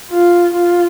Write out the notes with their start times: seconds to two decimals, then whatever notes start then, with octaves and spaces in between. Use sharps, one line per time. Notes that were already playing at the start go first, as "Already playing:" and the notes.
0.11 F4
0.54 F4